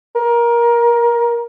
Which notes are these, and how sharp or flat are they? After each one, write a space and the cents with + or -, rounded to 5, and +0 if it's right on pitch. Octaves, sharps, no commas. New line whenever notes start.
A#4 +20